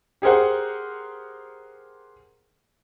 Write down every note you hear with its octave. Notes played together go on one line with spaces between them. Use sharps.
G4 G#4 A#4 C5 F#5